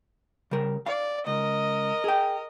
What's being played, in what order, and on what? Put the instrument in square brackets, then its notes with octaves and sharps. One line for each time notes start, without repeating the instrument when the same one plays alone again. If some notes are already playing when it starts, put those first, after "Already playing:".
[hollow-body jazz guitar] C#3 G3 A#4
[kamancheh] D5 [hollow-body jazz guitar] F5
[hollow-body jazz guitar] C#2 [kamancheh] A#4 D#5
[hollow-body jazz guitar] G#4 G5